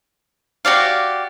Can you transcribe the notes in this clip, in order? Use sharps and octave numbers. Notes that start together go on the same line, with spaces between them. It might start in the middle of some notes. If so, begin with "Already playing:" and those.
F#4 G4 D5 F5